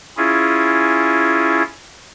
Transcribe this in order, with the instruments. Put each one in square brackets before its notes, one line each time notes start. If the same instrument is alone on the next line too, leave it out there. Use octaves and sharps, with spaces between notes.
[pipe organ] C#4 E4 F4 G#4